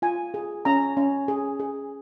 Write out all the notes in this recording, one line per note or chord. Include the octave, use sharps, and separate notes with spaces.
F4 G#5
G#4
C#4 A#5
C#4
G#4
G#4